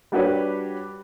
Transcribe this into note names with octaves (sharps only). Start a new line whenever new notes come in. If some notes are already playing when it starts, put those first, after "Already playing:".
G3 D4 F#4 G4 B4 C#5